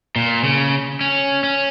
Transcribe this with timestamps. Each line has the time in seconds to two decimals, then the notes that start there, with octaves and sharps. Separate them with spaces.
0.16 A#2
0.44 C#3
1.01 C#4
1.44 C#4